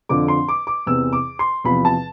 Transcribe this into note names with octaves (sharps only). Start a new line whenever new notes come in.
F2 D3 F3 D6
C6
D6
D6
E2 C3 E3 E6
D6
C6
E2 C3 F3 B5
A5